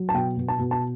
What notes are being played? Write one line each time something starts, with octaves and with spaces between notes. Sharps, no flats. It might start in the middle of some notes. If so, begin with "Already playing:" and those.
Already playing: F#3
A5
B2 G5
B2
A5
B2
A5